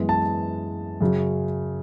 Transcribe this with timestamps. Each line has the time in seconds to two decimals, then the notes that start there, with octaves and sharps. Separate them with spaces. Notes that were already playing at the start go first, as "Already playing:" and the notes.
Already playing: F#2 E3 G#3 B3
0.09 A5
1.01 F#2 C#3 F#3